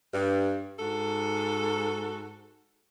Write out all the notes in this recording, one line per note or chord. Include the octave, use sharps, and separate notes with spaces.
G2
G#2 F#4 A4